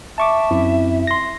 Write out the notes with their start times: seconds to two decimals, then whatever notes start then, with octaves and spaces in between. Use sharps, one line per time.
0.18 E5 A5 C#6 D6
0.51 F#2 C4 E4
1.07 C6 A#6